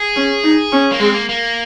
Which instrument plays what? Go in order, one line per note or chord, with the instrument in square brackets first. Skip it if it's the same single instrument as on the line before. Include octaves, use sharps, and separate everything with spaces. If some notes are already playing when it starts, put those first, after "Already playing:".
Already playing: [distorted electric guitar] G#4
[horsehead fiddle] C#4
D#4
C#4
[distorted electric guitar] A#3
[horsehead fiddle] G#3 [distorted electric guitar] C4
[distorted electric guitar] A#3
A#3